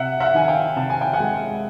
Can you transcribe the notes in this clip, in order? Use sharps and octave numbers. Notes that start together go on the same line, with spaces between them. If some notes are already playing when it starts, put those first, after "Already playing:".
Already playing: C3 E5 F#5
E5 F#5
D#3 G#5
F5 G5
C3 A5
G#5
G5
F#5 G#5
G#3